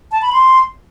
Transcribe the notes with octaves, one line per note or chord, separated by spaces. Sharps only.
A5
B5
C6